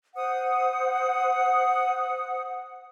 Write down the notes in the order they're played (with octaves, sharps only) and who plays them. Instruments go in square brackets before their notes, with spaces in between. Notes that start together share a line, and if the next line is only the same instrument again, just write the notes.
[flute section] C5 F#5 D#6